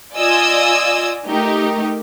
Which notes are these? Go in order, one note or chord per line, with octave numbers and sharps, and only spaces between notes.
F4 D5 D#5 G#5 D#6 E6
A3 D#4 G4 A#4